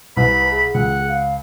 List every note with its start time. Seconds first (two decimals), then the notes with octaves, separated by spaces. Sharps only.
0.17 C2 B4 B5
0.51 G#4
0.74 C#2 F#5
1.08 F5